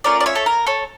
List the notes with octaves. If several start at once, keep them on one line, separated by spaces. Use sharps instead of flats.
A3 C#4 F4 A#4 D5
D5
C#5 E5
A4
A#4
A4 C#5